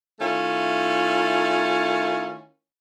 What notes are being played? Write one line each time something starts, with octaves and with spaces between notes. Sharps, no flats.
D#3 A3 C#4 E4 F4